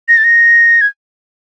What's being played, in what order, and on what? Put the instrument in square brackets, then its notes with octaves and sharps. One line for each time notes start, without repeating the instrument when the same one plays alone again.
[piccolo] A#6
A6
A#6
G#6